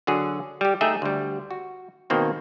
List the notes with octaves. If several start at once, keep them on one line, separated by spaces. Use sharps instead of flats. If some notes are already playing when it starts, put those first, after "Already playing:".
D3 F#3 F#4 G#4
G3 G4
A3 D#4 G#4 E5 G5
D2 G3
F#4
B2 D#3 A#3 C4 F#4